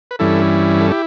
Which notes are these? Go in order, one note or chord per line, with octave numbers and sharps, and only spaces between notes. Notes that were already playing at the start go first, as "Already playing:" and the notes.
B4
G2 E3 G3 C#4 E4 A4
A4
E4 G4